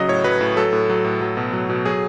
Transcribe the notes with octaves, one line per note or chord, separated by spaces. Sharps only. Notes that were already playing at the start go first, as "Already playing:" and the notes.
Already playing: C#3 F#3 D#5
A2 C#5
F#3 B4
A2
F#3 A4
A2
F#3
A2
F#3
B2
F#3
B2
F#3 G#4